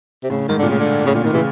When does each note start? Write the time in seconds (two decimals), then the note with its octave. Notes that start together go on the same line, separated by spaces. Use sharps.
0.24 C3
0.30 A2 C#3
0.49 G#2 D#3
0.59 A#2 D3
0.67 A2 C#3
0.80 D3
1.05 A2 C#3
1.15 A#2 D3
1.24 A2 D#3
1.33 C#3 E3